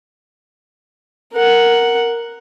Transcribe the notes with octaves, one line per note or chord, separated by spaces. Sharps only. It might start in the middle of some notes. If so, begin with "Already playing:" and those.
A#4 F#5